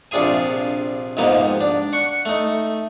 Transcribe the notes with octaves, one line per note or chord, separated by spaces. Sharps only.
A#1 C3 D4 F4 G#4 G#5
F2 G#2 C3 A#3 B3 D#4
D4
F#5 C#6
A3 D#4